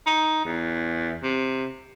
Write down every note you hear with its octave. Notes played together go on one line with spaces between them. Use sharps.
D#4
E2
C3